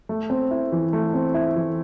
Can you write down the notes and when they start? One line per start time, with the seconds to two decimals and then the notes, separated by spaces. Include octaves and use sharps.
0.09 A3
0.30 C4
0.51 E4
0.72 E3
0.93 A3
1.14 C4
1.34 E4
1.56 E3